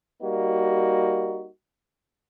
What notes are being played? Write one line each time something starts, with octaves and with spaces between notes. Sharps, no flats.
G3 A#3 D#4 F#4